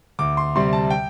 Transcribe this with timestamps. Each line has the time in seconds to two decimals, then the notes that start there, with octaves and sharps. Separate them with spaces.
0.19 D2 D6
0.37 C6
0.56 C3 G3 C6
0.73 A5
0.91 G5